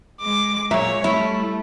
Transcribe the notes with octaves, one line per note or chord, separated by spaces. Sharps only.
G#3 D6
A#2 G#3 C#5 E5
G3 A3 E4